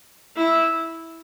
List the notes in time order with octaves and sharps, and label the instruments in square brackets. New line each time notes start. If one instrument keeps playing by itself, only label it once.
[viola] E4